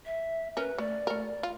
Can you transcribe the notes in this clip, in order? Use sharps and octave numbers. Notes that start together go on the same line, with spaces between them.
E5
C#4 A#4 B4
A3 D5
A3 A#4
F4